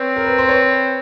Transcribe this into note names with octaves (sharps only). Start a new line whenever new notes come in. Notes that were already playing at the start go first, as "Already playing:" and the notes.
Already playing: C4 B4 C#5
A#4
B4
C5
B4 C#5